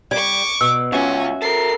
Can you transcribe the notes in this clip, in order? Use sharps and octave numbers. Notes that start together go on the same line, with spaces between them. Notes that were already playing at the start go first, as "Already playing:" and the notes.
G3 D5 C#6 D6
B2 E6
C#2 C#4 F#4 E5
A4 A#4 C7